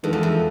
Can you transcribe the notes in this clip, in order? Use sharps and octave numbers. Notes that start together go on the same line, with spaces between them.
F2 D#3 G#3 B3 D4
E2
F2